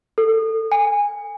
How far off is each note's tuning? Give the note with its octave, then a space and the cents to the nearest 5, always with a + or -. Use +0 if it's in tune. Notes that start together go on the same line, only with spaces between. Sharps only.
A4 +15
G#5 -20